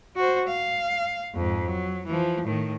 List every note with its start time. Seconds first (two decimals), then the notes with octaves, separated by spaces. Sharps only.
0.16 F#4 C5
0.47 F5
1.35 F2 G#2
1.66 F#3
2.06 E3 F3
2.45 A2 D#3